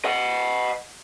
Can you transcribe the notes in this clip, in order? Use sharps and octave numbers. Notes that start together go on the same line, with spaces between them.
D#5 F#5